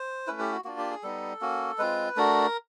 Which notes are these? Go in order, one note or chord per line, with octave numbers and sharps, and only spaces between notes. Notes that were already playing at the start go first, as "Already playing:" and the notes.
Already playing: C5
A3 C#4 E4 B4
G4
F#4
A#3 D4 F4 F#4
G4
G#4
G3 B3 D#4 A4
A#3 C#4 F#4
G#3 C4 F4 B4
A3 D4 F#4 A#4